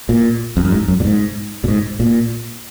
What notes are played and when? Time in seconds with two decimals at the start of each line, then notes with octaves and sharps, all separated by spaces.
0.09 A#2
0.57 F2
0.65 F#2
0.72 G#2
0.88 F#2
1.00 A#2
1.05 G#2
1.64 A#2
1.68 G#2
2.00 A#2